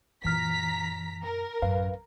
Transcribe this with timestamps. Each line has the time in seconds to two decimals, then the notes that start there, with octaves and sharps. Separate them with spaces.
0.24 F#2 A#2 E3 A#5 F6 B6
1.23 A#4
1.62 A1 F#2 B4 F5